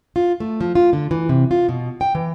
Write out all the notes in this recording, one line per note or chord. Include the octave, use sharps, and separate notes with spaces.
F4
A3
F3
F4
D3
E3
C3
F4
B2
G5
E3